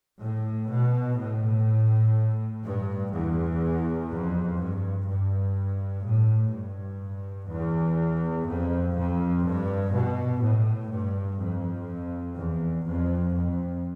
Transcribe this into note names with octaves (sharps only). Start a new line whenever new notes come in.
A2
B2
A2
G2
E2
F2
G2
G2
A2
G2
E2
F2
F2
G2
B2
A2
G2
F2
E2
F2
F2